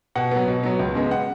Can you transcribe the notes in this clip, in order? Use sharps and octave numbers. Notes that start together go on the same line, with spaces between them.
B2 F#5
F#3 B3
B2
F#3 B3
C#2
C#3 G#3 B3
F#5